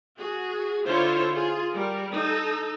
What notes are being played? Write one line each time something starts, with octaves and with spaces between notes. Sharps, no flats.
F#4 G#4
D3 E4 F4 C5 C#5
F4 G#4
G3 A#4
D#4 A4